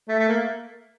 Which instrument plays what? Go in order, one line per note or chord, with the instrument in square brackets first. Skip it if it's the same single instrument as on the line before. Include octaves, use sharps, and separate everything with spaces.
[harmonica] A3
A3
A#3